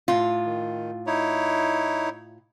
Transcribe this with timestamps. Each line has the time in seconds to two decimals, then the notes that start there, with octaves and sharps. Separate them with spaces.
0.08 A2 F4
0.46 D#3
1.07 D#4 E4 C#5